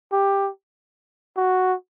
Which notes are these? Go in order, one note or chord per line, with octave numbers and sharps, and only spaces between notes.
G4
F#4